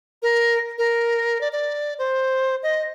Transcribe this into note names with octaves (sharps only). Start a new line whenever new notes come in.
A#4
A#4
D5
D5
C5
D#5